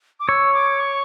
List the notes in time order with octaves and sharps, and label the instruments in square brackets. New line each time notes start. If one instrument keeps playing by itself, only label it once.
[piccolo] D6
[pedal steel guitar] C#5 [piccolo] E6
[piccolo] D6
C#6